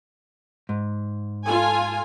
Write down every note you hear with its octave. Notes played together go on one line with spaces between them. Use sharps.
G#2
F4 A4 G#5